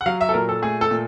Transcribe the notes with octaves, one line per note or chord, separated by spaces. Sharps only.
F#5
F#3 F5
E5
A4
A#2 A#4
A4
A3 G#4
A4
A#2